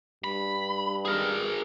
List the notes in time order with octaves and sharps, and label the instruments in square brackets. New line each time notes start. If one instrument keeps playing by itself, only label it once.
[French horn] G2 [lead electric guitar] B5
[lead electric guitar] G#4 A#4